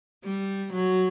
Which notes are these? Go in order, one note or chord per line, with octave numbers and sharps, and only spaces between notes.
G3
F#3